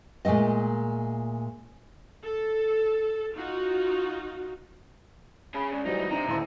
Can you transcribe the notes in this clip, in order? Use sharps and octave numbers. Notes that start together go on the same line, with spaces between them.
A#2 G#3 A3 C4 D#5
A4
D#4 F4 F#4
C#4 G#4 B5
C#2 C#3 D5
G#2 E3 F#3 G3 D#4
D#4
C3 D4 D#4 E5 A#5
D#1 D2 E4 A5 C6